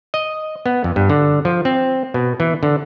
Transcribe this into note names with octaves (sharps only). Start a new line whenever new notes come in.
D#5
B3
F2
G2
D3
F3
C4
B2
E3
D3